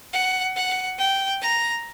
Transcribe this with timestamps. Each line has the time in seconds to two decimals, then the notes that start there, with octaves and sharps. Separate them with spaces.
0.13 F#5
0.55 F#5
0.98 G5
1.42 A#5